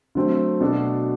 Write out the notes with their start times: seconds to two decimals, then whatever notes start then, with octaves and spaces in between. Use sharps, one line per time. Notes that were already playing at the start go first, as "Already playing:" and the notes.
0.15 D3 F#3 A3 C4
0.60 B2 A3 D4 F#4 A4